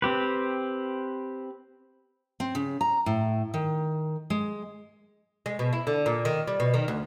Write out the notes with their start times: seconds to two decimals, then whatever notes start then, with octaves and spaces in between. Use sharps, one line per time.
0.02 C4 G4 B4
2.40 C4
2.55 C#3
2.81 A#5
3.06 A2
3.54 D#3
4.30 G#3
5.46 G#3
5.59 B2
5.73 E4
5.87 D3
6.06 A#2
6.25 D#3
6.48 G3
6.60 B2
6.74 D#3
6.88 D2